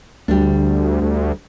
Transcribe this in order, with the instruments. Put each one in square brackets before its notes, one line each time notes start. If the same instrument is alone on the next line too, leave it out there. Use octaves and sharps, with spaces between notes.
[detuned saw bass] D2 [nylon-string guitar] G3 D4
[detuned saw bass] D2